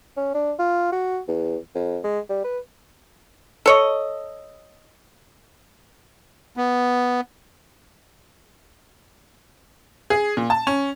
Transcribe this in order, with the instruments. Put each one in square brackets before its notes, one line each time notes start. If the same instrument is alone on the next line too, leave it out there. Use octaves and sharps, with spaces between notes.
[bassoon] C#4
D4
F4
F#4
E2
F2
G#3
G3
B4
[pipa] A4 C#5 D#5
[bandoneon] B3
[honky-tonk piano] G#4
A#2
A5
C#4